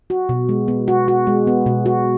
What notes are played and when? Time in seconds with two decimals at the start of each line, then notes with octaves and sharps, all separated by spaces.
0.10 F#4
0.29 B2
0.49 G#3
0.68 B3
0.88 F#4
1.08 F#4
1.27 G#3
1.47 B3
1.66 B2
1.86 F#4